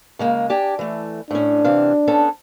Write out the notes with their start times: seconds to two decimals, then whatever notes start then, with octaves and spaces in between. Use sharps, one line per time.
0.19 C#3 G#3 A#3
0.50 D4 G4 G#5
0.79 E3 A3
1.31 A2 C#4 D4
1.64 C3 E3 F5
2.07 B3 C#4 A4